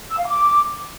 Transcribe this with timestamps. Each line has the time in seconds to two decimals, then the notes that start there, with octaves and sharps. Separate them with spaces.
0.10 E6
0.18 F5
0.27 D6